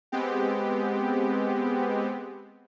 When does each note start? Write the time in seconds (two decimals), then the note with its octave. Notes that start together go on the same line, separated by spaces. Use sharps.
0.12 G#3 B3 C4 G4